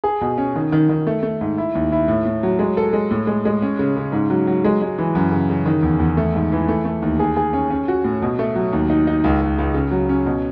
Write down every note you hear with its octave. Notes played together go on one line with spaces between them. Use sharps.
G#4
B2
C#4
D#3
D#3
D#3
A3
A3
G#2
E4
D#2
E4
A2
A2
F#3
G#3
A4
G#3
A2
G#3
G#3
C#4
C#3
C#3
G#2
F#3
F#3
G#3
G#3
E3
F#2
C#3
C#3
D#3
E2
E2
A3
G#2
E3
A3
A3
D#2
G#4
G#4
C#4
C#4
F#4
A2
B2
A3
F#3
D#2
D#4
D#4
C#2
C#2
C#2
C#3
F#3
C#4
B2